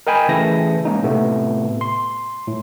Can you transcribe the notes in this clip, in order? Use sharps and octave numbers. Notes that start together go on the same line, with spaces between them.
A#4 D#5 G5 G#5 B5
C#3 E3 A3 A4 A#6
G#3 A#3 C#4 D#4
A2 C3 A3 B3
C6
A2